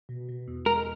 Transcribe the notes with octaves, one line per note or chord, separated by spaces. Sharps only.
B2
B2
E2
G#3 A#4